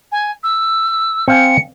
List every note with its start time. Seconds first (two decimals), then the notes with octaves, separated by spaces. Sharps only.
0.12 G#5
0.43 E6
1.28 C4 F5 G#5 C#7